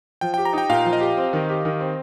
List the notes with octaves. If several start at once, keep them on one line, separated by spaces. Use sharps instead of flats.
F3 G5
G4 G5
A#5
D#4 G5
A#2 F5
F3
D#5
G4
C4
D#3
G4
D#3
C4